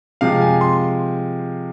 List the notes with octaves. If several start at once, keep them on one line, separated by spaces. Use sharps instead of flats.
C3 F3 G#3 F5
G#5
C6